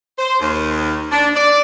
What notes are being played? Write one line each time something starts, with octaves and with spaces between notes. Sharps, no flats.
C5
D#2
D4
D5